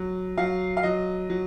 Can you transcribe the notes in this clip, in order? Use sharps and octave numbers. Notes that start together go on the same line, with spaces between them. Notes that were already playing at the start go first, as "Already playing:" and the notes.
Already playing: F#3
F#3 F5
F5
F#3 D#5
F#3